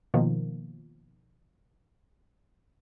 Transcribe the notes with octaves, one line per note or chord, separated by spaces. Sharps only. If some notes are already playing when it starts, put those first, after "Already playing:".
B2 D#3 F3 A#3